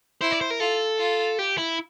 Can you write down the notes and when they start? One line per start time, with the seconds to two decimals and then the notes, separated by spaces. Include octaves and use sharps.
0.21 E4 C5
0.31 D5
0.41 C5
0.50 A#4
0.60 F4 A4
0.99 F4
1.39 G4
1.58 E4